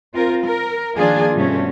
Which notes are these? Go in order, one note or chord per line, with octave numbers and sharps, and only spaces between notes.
C4 F4 A#4
A#4
D#3 F3 A#3 D4 F4 G#4
G2 B2 D3 A3 C4 C#4